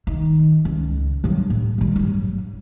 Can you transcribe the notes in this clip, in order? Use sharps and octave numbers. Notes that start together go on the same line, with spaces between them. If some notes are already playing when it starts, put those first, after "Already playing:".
D#3
C#2
G2 F#3
A2
A#1 G3
G2 F#3